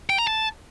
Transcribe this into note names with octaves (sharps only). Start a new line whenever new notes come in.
G5
A#5
A5